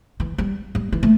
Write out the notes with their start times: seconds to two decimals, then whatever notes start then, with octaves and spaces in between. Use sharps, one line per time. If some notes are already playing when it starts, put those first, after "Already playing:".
0.20 E3
0.38 G3
0.75 G3
0.92 E3
1.03 A3